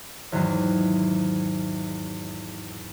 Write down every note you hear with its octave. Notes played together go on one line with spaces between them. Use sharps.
E2 G#2 D#3 F#3